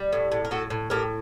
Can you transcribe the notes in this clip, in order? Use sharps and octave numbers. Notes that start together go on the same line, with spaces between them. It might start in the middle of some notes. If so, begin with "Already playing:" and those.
Already playing: G3
A2
A2
A#4
A2 F#4 A4
A2
A2 G4 A#4